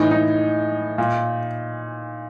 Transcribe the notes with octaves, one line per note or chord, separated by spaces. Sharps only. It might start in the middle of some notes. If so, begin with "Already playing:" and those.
Already playing: A2 E3 D#4
D#4
A#2